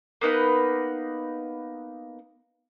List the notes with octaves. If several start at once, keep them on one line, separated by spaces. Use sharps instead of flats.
A#3 B3 D#4 B4